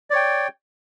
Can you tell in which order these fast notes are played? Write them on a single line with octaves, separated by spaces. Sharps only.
D5 C#5 G5